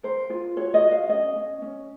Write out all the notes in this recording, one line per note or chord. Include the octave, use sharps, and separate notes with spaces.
A#4 C5
F4
F#4 C#5
D#5
F#4
F5
C#4 D#5
C#4
C#4